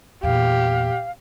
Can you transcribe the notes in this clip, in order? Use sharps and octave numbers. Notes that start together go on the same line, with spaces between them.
E2 A#2 G4 F5